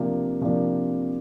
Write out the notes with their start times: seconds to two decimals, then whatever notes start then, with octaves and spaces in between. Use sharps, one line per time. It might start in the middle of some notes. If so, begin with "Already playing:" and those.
Already playing: C3 F3 A#3 D4
0.41 C3 F3 A#3 D4